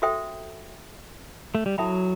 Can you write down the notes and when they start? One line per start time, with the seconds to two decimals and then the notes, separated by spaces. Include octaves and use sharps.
0.02 F#4 A4 C5 E5 G5
1.55 A3
1.66 G3
1.78 F#3 E4 A4 E5 G5 B5